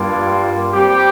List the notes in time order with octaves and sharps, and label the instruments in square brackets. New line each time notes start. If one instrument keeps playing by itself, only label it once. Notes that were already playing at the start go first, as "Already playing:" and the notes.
Already playing: [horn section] G2 G3 A#3 F4 D5
G3 C4 G4